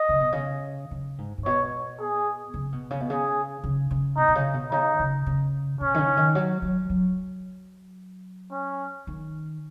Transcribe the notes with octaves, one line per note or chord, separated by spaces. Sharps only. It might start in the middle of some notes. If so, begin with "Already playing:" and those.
Already playing: D#5
C#3
B2
C#3
C#3
G#2
G#2
B2 C#5
G#4
C#3
B2
C#3
B2
C#3 G#4
C#3
C#3
B2 D#4
B2
C#3
B2
C#3 D#4
C#3
C#3
B2 C#4
D#3
C#3
D#3
F#3
F#3
F#3
C#4
D#3